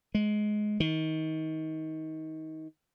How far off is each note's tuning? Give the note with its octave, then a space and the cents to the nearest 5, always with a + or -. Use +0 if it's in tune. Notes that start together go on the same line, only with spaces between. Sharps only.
G#3 +20
D#3 +25